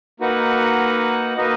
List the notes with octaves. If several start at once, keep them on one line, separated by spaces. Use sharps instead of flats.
A#3 D#4 F#4 B4 F#5
A#3 D#4 F#4 B4 D#5